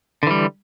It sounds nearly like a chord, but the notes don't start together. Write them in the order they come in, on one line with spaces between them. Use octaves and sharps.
D3 E3 G3